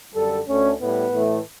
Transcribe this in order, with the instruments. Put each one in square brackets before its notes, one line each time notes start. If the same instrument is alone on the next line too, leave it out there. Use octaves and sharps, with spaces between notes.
[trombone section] F#2 D3 G3 A4
D2 D3 A3 C#4
A2 G3 B3
A2 E3 A3